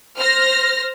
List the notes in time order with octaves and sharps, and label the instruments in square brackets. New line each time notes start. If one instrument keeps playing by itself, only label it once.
[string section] C5 F6 A#6